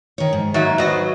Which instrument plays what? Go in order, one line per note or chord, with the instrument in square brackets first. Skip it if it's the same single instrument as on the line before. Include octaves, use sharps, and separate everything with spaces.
[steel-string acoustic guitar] D#3 C#5
G#2
[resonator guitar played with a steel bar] D#3 F#3 A#3 [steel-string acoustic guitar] E5
[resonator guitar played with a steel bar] F#3 D#5 [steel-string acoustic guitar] F4 B4 C5